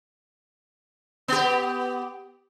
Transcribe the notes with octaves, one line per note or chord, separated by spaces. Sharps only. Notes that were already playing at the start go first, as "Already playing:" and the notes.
B3 G4